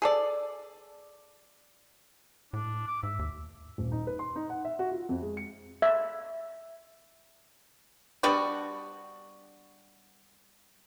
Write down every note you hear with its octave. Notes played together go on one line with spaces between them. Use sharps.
G#4 A4 D5
A2 D4
D6
G#2 E5
D#2
D#1
D#4
B4
C6
D#4
F#5
E5
F#4
F4
F2
G#3
C#7
E5
G3 B3 D4 F#4